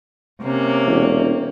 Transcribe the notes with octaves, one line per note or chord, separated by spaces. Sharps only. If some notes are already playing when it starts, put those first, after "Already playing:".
C3 A#3 C#4
E1